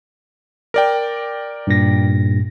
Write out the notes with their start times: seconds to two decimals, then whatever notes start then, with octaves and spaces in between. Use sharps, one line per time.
0.74 A#4 D5 G5
1.67 G2 A#2 A#6